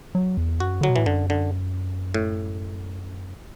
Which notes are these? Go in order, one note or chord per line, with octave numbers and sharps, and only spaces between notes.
F#3
E2
F#2 F#4
D3 F#3
B2
A2 E3
F#2 D3
D3
A2